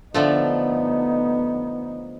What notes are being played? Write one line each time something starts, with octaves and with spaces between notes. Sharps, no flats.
D3 F3 A3 B3 D#4